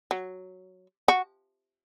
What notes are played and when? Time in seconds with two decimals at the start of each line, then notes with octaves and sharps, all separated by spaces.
0.11 F#3
1.08 F#4